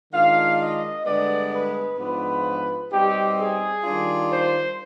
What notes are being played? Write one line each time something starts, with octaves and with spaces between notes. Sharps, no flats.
D#3 G#3 D4 F4 F5
D#5
G2 D3 G#3 B3 D4 D5
B4
G#2 F3 B3 D4 F4 B4
B2 G3 C4 D#4 G4
G#4
D#3 G3 D4 F4
C5